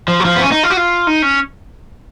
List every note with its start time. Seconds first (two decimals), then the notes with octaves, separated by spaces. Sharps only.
0.08 F3
0.20 F#3
0.25 F3
0.36 B3
0.42 C#4
0.51 D#4
0.63 F4
0.70 F#4
0.77 F4
1.07 D#4
1.22 C#4